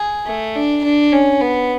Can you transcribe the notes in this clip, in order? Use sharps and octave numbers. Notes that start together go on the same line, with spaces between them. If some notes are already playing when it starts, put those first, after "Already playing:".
Already playing: G#4
A3
D4
D4
C#4
B3